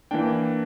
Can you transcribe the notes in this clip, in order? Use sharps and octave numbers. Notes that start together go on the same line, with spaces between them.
E3 A#3 D4 G5